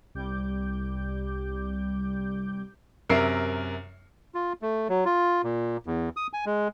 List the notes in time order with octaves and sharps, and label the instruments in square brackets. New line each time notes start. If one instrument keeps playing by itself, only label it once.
[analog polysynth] C2 G3 D6 G6
[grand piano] F#2 C3 A#4 E5 C7
[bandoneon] F4
A3
F#3
F4
A#2
E2
D#6
G#5
G#3